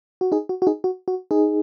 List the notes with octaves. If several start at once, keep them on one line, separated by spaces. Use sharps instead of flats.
F#4
D#4 G#4
F#4
F#4
D#4 G#4
F#4
F#4
D#4 G#4